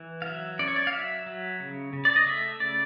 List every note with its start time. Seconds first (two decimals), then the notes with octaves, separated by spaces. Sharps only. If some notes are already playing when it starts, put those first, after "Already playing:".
Already playing: E3
0.22 F5
0.26 F#3 E5
0.59 C#4 D5
0.68 C#5
0.76 D5
0.87 F5
0.93 F#3 E5
1.26 F#3
1.60 C#3
1.93 C#3
2.05 D5
2.16 D#5
2.26 A3 E5
2.60 C#3 D5